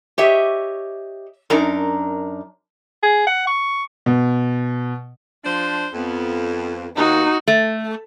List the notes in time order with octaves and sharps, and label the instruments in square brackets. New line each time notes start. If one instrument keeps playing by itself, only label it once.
[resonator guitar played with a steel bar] G4 C#5 D#5 E5
F#2 D4 D#4 A#4 A#5
[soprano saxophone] G#4
F#5
C#6
[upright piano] B2
[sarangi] F3 [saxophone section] D4 C5
[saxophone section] F2 [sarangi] B3
[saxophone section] D#2 [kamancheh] D#4 [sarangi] F#4
[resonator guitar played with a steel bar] A3